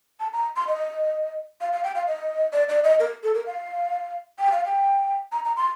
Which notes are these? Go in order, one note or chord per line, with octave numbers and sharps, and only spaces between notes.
A5
A#5
C6
D#5
F5
F5
G5
F5
D#5
D5
D5
D#5
A#4
A4
A#4
F5
G5
F5
G5
A#5
A#5
C6